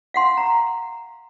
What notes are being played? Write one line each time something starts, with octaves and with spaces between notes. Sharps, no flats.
F5 F#5 C6
A#5